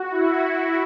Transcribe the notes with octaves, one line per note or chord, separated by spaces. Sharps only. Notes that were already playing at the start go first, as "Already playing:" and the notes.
Already playing: F#4
E4